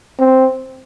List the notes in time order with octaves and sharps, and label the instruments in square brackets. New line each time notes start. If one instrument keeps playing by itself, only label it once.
[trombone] C4